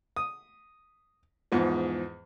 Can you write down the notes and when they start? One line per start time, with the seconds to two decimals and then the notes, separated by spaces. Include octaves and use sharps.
0.16 D#6
1.52 E2 G#2 F3